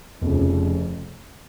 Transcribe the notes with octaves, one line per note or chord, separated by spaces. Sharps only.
F1 F2 C#3